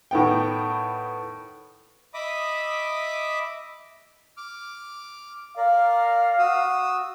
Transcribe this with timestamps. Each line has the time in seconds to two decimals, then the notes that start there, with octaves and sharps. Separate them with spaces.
0.11 A2 D#3 B3 G5
2.14 D#5 E5 B5 D6 D#6
4.37 D6 F6
5.57 A#4 D5 F5
6.39 F#4 D#6 E6